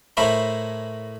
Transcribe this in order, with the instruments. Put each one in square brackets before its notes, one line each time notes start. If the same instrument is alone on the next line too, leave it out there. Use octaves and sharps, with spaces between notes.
[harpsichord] A2 E4 A#4 C5 C#5 B5